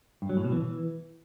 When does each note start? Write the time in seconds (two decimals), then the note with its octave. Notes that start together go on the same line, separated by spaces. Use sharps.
0.22 G2
0.29 F#3
0.37 A2
0.44 B2
0.52 E3